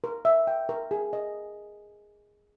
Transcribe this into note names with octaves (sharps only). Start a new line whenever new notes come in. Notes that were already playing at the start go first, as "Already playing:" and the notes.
A#4
E5
G5
A#4
G#4
D#5